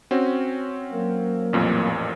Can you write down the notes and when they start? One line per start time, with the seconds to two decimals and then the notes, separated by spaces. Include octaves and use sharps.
0.11 C4 C#4 F#4
0.92 F#3 A#3 A#4
1.53 A1 F2 A#2